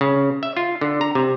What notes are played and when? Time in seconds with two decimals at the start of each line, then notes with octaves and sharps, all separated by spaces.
0.01 C#3
0.43 E5
0.57 F4
0.81 D3
1.01 A#5
1.15 C3